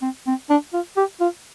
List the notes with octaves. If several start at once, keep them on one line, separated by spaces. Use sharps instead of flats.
C4
C4
D4
F4
G4
F4